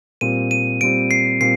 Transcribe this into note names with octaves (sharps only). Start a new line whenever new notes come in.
A#2 G3 C4 D#7
D#7
A#2 G3 C4 D7
C7
A#2 G3 C4 C7